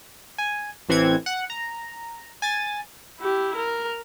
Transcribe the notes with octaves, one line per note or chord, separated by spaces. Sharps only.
G#5
A1 E3 C4 F#5 G#6
F#5
A#5
G#5 A6
E4 G4
A#4